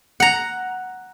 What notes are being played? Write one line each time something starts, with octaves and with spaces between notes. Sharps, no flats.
F#5 A#5